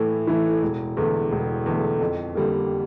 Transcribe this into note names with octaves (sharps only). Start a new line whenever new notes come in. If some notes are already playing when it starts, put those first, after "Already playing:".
Already playing: A2 E3 A3 E4
E3 A3 E4
E1
E2 D3 A3
E1
E2 D3 A3
F2
D3 G3 A#3